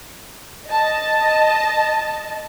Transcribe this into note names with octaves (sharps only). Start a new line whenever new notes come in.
D#5 A5